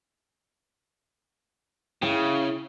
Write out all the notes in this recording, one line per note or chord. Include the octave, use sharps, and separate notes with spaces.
C#3 E4 G#4 G5